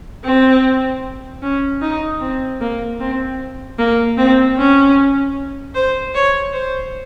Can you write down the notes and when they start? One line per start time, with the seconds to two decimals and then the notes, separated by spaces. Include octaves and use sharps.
0.25 C4
1.42 C#4
1.82 D#4
2.21 C4
2.61 A#3
3.00 C4
3.79 A#3
4.18 C4
4.57 C#4
5.75 C5
6.15 C#5
6.53 C5